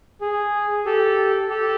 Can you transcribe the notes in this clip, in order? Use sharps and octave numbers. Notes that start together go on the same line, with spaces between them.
G#4
G4 A4
G4 A4